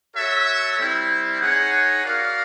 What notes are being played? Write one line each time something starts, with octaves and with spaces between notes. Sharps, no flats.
F#4 A4 C#5 E5
G3 C4 E4
D#4 G#4 C#5 F#5
F#4 A#4 D5 F5